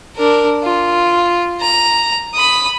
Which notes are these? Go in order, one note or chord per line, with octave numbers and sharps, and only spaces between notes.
D4 A#4
F4
A#5
B5 D#6